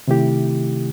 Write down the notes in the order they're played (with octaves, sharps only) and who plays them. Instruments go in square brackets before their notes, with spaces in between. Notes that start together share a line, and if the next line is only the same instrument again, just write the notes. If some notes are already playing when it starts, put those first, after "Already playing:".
[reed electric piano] C3 D#3 A3 E4 G4